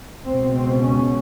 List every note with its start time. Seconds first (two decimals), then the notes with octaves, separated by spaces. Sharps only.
0.25 C#2 B2 C4
0.54 C4
0.83 C#4